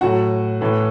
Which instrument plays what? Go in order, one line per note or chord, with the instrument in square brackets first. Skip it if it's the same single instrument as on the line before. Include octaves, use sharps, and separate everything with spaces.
[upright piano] A2 F#3 F#4 F#5
A2 E3